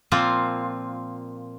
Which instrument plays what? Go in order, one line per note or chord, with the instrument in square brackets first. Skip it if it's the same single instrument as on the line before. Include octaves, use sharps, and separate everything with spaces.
[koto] A#2 F3 A#3 C4 F4